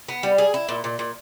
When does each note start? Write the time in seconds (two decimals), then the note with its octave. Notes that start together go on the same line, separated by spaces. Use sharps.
0.08 B3
0.23 G3
0.38 G#4
0.54 E4
0.69 A#2
0.84 A#2
0.99 A#2